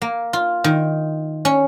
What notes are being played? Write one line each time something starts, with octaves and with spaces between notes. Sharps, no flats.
A#3
F4
D#3
C#4